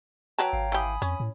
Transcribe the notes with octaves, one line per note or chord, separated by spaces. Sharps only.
F#3 B4 C#5 G5 A5 A#5
G#1 F5
E3 G4 G#5 B5 D#6
F2 C#4
A2